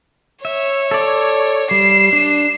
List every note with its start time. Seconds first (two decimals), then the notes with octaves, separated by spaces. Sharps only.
0.45 C#5 E5
0.91 A4 D5
1.71 G3 C7 E7
2.13 D4